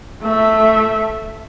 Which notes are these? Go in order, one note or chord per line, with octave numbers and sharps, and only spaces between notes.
A3 E5